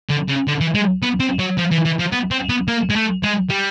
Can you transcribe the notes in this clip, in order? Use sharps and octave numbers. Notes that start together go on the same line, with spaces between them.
D3
C#3
D3
E3
G#3
B3
C4
F#3
F3
E3
E3
F3
B3
C4
B3
A#3
G#3
A3
G#3
G3